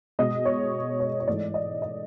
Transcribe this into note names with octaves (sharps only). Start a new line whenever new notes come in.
B2 G#3 D#5
C#5
C#5
C#5
G#2 E3 A3 D5
D#5
D#5